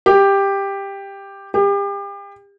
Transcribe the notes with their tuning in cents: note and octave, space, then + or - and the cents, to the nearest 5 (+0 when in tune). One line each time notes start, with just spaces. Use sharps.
G4 +10
G4 +35